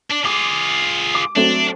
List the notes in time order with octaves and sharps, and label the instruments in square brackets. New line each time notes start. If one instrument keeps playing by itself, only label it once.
[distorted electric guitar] D4
[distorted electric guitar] F4 G#4 [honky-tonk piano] D6
[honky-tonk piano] D6
[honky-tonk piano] F#3 A3 C4 [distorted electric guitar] D4